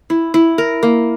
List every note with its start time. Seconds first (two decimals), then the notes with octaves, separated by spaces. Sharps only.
0.10 E4
0.34 E4
0.58 A#4
0.83 A#3